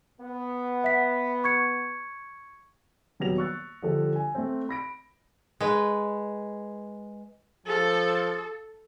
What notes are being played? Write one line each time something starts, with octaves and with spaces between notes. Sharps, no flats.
B3
E5 B6
C#6 G#6 C#7
D#1 F#3 G3 B3 A#6 F7
C#6 E6 F#6 A6
D3 F3 G3 G4 A4
G#5
A3 C4
B5 A#6 D7
G#3 B4
F3 A4